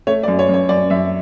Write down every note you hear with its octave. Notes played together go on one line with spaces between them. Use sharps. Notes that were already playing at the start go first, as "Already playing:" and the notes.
A3 C#5
D5
F#2
C#5
F#2 C#5
F#2 D5
F#2 E5